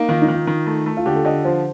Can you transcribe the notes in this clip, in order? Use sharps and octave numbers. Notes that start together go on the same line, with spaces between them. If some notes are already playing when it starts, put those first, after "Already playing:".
Already playing: A#3 D#4
D#3 F4
D#4
D#3 F4
D#3
A3
A3
F4
D3 G4
A4
D3 D#5
F3 C5